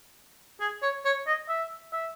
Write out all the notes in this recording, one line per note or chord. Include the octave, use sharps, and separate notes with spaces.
G#4
C#5
C#5
D#5
E5
E5